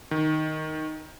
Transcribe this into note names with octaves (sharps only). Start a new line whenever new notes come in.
D#3